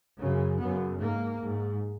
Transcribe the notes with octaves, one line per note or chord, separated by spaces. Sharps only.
F#2 C#3
F#2 C#3 B3
G#2 A#3
G#2